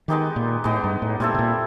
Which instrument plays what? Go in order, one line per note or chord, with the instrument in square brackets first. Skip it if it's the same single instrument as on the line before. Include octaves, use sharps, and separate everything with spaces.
[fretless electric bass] D#3 [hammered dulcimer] G#3 B3 D#4 G4
[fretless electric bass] A#2
[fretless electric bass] A2 [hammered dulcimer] G#3 B3 D#4 G4
[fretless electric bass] G2
A2
[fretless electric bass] A#2 [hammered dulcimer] G3 C4 E4 A4
[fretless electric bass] B2
A#2